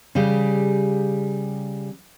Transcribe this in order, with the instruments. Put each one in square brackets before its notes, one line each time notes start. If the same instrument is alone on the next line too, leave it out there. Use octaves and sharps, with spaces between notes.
[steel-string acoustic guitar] C#3 G3 G4 G#4